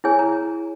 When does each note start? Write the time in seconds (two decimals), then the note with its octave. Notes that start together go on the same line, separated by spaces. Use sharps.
0.04 E4 G#4 C#5 G#5
0.19 A#5